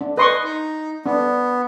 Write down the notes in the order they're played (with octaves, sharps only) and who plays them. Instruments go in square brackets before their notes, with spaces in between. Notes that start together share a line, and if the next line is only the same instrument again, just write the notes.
[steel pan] D4
[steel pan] B4 C6 C#6 [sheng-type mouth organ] D#5
[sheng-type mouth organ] D#4
[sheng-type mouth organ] B3 [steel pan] D4